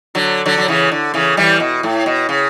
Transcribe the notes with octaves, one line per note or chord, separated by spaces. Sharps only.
D3 F#3
D3 F#3
F#3
C#3 E3
D3
C#3 E3
E3 G3
B2
A2
B2
C#3